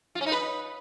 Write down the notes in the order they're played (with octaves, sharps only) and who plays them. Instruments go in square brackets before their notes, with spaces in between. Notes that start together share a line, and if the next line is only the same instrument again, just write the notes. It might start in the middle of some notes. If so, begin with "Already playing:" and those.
[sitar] F4
C#4
D#4
B4